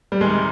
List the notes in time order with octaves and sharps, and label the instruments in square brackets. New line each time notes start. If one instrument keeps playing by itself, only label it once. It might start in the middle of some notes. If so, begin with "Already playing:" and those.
[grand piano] G3
[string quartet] D2 C3 D#3 [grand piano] G#3